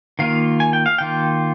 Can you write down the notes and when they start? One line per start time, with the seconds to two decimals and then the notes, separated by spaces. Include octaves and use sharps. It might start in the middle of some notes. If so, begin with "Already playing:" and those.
0.19 D#3 A#3 F4 F5
0.60 G#5
0.73 G5
0.86 F5
0.98 D#3 A#3 F4 G5